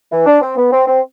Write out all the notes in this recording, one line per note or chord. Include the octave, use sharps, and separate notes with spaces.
E3
D4
C4
B3
C4
C4